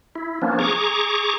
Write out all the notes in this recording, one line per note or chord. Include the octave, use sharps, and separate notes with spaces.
E4
F3 A#3 B3 C#4 D4
G#4 A#5 C#6 D6